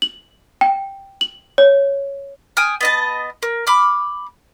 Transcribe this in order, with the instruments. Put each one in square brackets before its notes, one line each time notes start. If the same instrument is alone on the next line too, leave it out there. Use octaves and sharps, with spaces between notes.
[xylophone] F#7
G5
F#7
C#5
[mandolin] G5 G#5 D#6 F6
B3 D#5 A5
A#4
B5 D6 F6